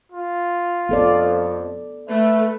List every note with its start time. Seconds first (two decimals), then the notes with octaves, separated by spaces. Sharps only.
0.12 F4
0.89 F2 B3 A4 D5
2.09 A3 B4 E5